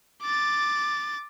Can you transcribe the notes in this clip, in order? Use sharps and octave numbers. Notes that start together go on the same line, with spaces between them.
D6 A6